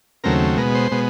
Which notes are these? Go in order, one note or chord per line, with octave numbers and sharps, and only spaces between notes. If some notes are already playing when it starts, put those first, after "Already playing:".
D#2 C#3 F#3 A3 C4 A#4
B2 G#3 B3 A#4
C5
B2 G#3 B3